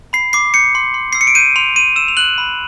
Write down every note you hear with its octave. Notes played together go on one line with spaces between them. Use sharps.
B5 C7
D6 C7
G6 C#7
C6
C6
E6 C7
C#7
D7
G6 D#7
C6 F7
C6 D#7
E6 E7
F7
F#6 F#7
B5